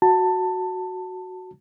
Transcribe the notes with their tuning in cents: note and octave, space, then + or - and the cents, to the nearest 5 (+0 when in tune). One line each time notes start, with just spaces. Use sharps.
F#4 +0 A5 +15